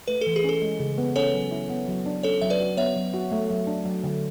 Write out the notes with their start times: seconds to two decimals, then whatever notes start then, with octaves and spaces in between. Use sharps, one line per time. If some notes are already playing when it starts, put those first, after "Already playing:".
0.08 A3 B4
0.21 A4
0.27 E3
0.36 G#4
0.44 C#4 A4
0.62 G#3
0.79 C#3
0.98 B3
1.16 C#4 A4 C#5
1.34 F#3
1.52 E4
1.70 B3
1.88 F#3
2.06 D4
2.23 C#4 A4 C#5
2.42 F#3 E5
2.50 B4 D5
2.60 F#4
2.77 B3 C#5 E5
2.96 F#3
3.14 F#4
3.32 A3
3.50 F#3
3.67 D4
3.85 F#3
4.04 D3